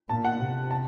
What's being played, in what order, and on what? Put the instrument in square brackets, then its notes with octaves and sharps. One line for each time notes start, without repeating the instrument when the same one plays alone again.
[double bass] A#2 [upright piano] A5
[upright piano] F#5
[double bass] C3
[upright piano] A5